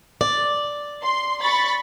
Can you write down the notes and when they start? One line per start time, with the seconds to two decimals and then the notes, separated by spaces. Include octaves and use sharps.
0.21 D5
1.03 C6
1.42 B5 C#6 A6